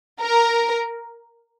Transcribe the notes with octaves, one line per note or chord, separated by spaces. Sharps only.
A#4